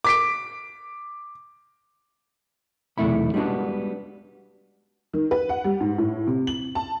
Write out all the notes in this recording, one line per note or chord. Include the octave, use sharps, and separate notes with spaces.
D6 B6 D7
B1 E2 C3 A3 E4 B5
G3 G#3 B3 D4 F#4
D#3
B4
F#5
G3
G#2
A2
C3
F#7
A5